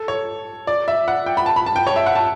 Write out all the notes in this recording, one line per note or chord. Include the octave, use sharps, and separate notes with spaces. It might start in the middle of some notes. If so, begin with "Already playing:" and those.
Already playing: A4
C#5
D5
E5
F#5
G5
B5
A5
B5
A5
G5
C#5
E5
F#5
A5